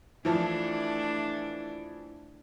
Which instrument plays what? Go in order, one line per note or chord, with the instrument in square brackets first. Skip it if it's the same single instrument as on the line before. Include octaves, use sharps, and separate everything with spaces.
[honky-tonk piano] E3 F3 [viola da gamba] A3 D4 E4